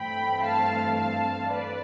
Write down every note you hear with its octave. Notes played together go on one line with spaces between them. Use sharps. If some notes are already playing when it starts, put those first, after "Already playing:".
Already playing: G2 E3 A3 C4 G5 B5
F5 A5
F5 A5
B4 D5